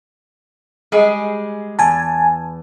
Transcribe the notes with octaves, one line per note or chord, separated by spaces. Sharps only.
G3 G#3 G#4
E2 G#5 A5